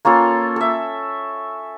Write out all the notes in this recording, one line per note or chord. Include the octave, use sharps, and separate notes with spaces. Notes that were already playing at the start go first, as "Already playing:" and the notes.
A#3 C#4 F4 A4
A4 E5